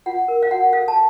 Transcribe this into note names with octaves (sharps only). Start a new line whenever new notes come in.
F4 F#5
A#4
F5
F#4 F#5
A4 F5
A5